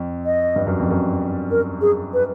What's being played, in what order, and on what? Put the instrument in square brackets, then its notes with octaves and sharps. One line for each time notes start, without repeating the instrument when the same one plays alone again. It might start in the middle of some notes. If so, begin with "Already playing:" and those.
Already playing: [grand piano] F2
[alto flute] D#5
[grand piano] G2
F#2
F2
F#2
[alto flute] A#4
G#4
B4